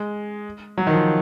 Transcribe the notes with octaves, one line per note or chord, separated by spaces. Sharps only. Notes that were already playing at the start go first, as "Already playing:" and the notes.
Already playing: G#3
F#3
D#3
F3